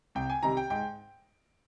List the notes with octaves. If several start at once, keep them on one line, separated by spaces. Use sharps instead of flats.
C2 G5
G#5
C3 D#3 G3 A#5
G5
G#2 G5